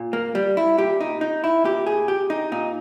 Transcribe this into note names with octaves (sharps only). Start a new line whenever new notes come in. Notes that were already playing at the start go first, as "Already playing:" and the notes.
Already playing: A#2
A#3
G3
E4
A#2 G4
D#4
D#4
E4
A#2 G4
G#4
G4
D#4
A#2 D#4